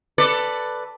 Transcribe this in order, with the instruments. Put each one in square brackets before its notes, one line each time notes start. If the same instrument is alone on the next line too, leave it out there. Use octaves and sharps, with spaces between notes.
[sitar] A4 B4 D5